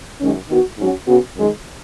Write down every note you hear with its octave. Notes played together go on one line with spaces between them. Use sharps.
F#2 D#3 G#3 C#4
D#3 B3 F#4
G#2 F#3 C#4 F#4
C#3 B3 F#4
F#2 D#3 G#3